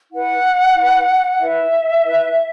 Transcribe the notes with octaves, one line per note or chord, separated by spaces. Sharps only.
E4 B4 F#5
E4 B4
E4 B4 E5
E4 B4